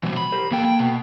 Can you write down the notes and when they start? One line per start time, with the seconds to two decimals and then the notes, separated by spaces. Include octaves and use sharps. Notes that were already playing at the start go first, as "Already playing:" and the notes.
0.03 B2 E3 G3
0.17 B5
0.32 G4 A#4 C5
0.51 E2 A#3 A4 G5
0.65 G5
0.79 B2